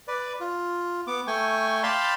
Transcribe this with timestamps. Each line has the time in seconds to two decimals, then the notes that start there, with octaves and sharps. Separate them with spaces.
0.08 B4 D5
0.40 F4
1.07 B3 D6
1.27 A3 G5 G#5 C#6
1.83 D5 F5 G5 A5 B5 C6